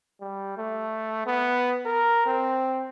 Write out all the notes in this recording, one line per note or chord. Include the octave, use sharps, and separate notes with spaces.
G3
A3
B3
A#4
C4